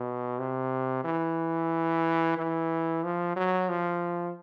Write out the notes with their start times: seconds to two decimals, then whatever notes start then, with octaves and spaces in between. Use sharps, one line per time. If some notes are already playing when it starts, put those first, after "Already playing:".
Already playing: B2
0.39 C3
1.04 E3
2.38 E3
3.04 F3
3.36 F#3
3.69 F3